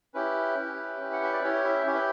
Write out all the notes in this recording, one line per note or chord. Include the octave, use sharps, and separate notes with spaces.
C#4 E4 G4 B4
C#4 E4 G4
C#4 E4 G4
F#5
E5
D5
C#4 E4 G4 C#5
E4 E5
C#4 E4 G4 C#5
B4